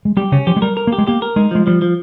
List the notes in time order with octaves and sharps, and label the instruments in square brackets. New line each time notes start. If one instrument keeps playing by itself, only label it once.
[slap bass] G#3
[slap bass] G3 [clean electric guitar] G4
[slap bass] C#3 [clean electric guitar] C#4
[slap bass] F3 [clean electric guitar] G4
[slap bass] G#3
[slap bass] G3 [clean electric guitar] A#4
[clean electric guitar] A#4
[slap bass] A#3
[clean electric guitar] G4
[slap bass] G#3
[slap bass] A#3 [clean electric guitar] G4
[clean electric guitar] A#4
[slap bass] G#3 [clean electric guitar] D#4
[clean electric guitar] F3 [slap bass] G#3
[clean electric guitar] F3 [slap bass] G3
[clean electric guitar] F3